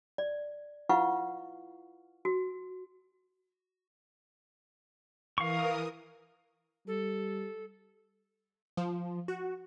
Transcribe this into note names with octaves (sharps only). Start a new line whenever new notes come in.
D5
E4 F4 B4 F5 F#5 C#6
F#4
E3 A#4 F5 C#6 D#6
G3 A4
F3
F#4